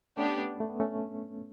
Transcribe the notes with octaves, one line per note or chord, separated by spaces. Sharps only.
A3 B3 C#4 D4 G4
A3
B3
A3 C#4